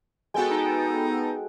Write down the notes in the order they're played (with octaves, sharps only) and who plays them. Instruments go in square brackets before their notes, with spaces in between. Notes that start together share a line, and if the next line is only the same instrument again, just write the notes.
[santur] G#3 F#4 [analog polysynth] B3 A4 G5
[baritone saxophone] D#4